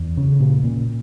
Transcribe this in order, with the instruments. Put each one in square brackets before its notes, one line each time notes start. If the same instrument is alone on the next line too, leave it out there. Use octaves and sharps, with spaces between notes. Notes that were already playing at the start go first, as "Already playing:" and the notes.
Already playing: [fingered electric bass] E2
C#3
A#2
A#2